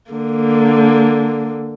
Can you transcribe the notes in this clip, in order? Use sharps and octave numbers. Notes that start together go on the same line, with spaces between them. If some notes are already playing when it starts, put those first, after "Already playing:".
D3 A#3